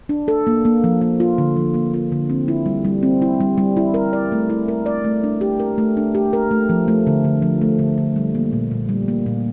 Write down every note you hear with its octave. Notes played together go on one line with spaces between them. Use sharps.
D4
A4
A#3
A#3
F3
A#3
F4
D3
F3
A#3
F4
D3
C4
E4
G3
G3
C4
E4
G3
G3
E4
A#4
D5
A3
E4
A#4
D5
A3
D4
G4
A#4
A3
D4
G4
A#4
A3
F3
A3
D3
D3
F3
A3
D3
D3
G3
A#3
A#2
A#2
G3
A#3
A#2